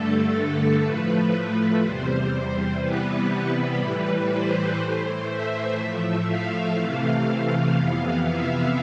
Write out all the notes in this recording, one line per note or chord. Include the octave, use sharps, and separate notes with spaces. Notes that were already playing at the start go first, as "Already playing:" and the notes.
Already playing: G2 D3 A3 A4
A2 F3 A3 B4
E2 C3 G3 C5
C3 E3 G3 B3 B4
A2 E3 G3
C5
A2 E3 A3
E5
A2 F3 A3
F5
C3 E3 A3
F5
F2 C3 E3 B3
E5